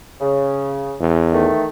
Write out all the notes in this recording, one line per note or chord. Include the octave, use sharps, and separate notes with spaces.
C#3
E2
D#3 A3